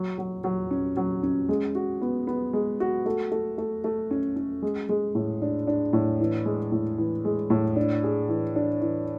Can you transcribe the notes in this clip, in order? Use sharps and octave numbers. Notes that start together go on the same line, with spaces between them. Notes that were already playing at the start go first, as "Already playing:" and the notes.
Already playing: F#3
F#3
F#3
C#4
F#3
C#4
G#3
F#4
B3
B3
G#3
F#4
A3
A3
A3
A3
C#4
C#4
G#3
G#3
A2
D4
D4
A2
E3
G#3
A2
E3
G#3
A2
D4
G#4
E3
D4
E3